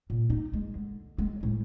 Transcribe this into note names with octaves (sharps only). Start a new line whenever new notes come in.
A#2
D#4
G#3
D3
G#3
A2